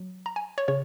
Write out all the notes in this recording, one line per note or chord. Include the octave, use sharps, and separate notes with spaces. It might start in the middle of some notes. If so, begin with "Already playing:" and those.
Already playing: F#3
A#5
G#5
C#5
C#3 C#5